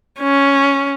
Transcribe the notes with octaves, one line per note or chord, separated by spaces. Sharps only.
C#4